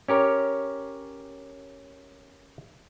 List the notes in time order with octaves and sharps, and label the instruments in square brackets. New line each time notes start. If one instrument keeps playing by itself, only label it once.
[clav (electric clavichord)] C#4 G4 A#4 C#5